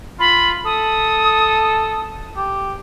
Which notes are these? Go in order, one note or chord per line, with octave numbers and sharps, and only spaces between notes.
F4 B5
A4 D#6
G4